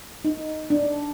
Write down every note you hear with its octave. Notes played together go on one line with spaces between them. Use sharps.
D#4
D4